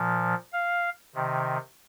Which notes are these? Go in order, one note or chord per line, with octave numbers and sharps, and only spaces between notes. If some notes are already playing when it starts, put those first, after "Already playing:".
Already playing: A#2 F3
F5
C3 D#3